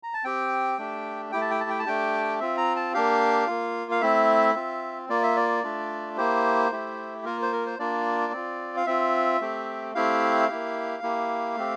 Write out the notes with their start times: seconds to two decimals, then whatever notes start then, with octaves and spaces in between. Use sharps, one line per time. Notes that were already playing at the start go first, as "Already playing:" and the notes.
0.03 A#5
0.14 A5
0.24 C4 G4 G5
0.78 A3 D4 G4
1.32 A3 E4 G4 G5
1.41 A5
1.51 G5
1.60 A5
1.70 G5
1.79 A5
1.86 A3 D4 G4 G5
2.40 C4 F4 E5
2.57 A#5
2.76 A5
2.93 A#3 D4 G4 F5
3.47 A#3 F4
3.91 F5
4.01 A3 C4 E4 E5
4.55 C4 F4
5.09 A#3 F4 D5
5.23 E5
5.36 D5
5.64 A3 D4 F4
6.17 A#3 E4 G4 C5
6.71 A3 E4 G4
7.25 A#3 F4 A#4
7.42 C5
7.52 A#4
7.66 C5
7.79 A#3 D4 F4 D5
8.33 C4 F4
8.77 F5
8.86 C4 F4 E5
9.40 A3 C4 G4
9.95 A3 C4 E4 G4 F5
10.49 A#3 E4 G4
11.03 A#3 E4 G4
11.56 A3 C4 G4